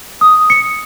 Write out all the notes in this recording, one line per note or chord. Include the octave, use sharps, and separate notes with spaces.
D#6
C#7